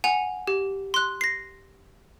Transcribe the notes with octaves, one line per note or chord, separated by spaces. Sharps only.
F#5 G#5 F7
G4
C6 F#6
A#6 C7